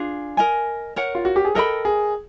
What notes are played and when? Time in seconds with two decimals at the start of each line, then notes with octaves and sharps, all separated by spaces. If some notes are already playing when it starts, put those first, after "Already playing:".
Already playing: D4 F4 G#4
0.37 A#4 D#5 G#5
0.96 A#4 C#5 F#5
1.15 F4
1.25 F#4
1.36 G4
1.45 G#4
1.55 A4 A#4 D#5 G5 B5
1.85 G#4